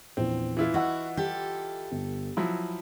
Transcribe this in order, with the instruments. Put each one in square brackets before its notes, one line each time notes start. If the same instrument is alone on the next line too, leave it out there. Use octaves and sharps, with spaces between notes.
[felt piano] A#1 E2 [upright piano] C4
[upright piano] E3 E4 F4
[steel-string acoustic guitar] F#4 [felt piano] D#5 F#5 E6
[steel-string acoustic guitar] G4 A4
[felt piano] G1
[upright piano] F3 F#3 E4 [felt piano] B5